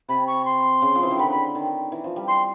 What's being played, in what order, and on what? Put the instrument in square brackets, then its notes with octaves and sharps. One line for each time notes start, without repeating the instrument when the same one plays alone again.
[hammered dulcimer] C3 [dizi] B5
[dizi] C#6
C6
[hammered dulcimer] C#3
F3
E3
D#3
[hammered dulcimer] D3 [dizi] B5
[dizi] B5
[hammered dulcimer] D#3
E3
F3
G3
[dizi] C6